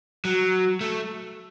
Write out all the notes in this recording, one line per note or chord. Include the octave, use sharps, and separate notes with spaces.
F#3
A3